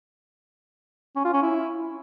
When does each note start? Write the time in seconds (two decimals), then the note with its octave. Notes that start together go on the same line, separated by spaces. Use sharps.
1.16 C#4
1.25 F4
1.33 C#4
1.42 E4